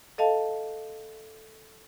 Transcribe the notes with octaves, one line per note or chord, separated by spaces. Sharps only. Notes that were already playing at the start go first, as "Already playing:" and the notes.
A4 D#5 F5 A5